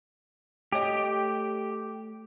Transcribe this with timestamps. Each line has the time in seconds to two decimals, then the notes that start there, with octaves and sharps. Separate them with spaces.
0.72 A3 G4 C#5 D#5